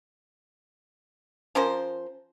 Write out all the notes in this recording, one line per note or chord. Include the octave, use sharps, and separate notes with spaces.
F3 C#4 A#4 C5